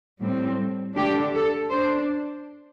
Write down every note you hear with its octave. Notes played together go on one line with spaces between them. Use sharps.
A2 G3 C4
D3 A3 D4 G4
A4
D4 C5